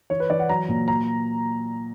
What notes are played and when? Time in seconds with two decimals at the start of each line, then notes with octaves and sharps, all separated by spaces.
0.10 E3 C#5
0.20 B4
0.30 E3 D5
0.40 F#5
0.49 F#3 A#5
0.69 A#2
0.88 A#5